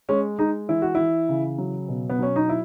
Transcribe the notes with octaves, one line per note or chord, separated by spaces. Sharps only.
G#3 C#4
G#3 D#4
E3 E4
F#4
E3 E4
C#3
F#3
B2
B3
F#3 C#4
D#4
E4